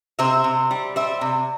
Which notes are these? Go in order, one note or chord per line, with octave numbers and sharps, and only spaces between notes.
C3 C5 E5
C3
G3
G3 C5 E5
C3